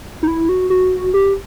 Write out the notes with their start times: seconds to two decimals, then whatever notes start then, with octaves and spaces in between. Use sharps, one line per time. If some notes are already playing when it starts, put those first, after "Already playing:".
0.23 D#4
0.27 E4
0.49 F#4
0.70 F#4
1.14 G4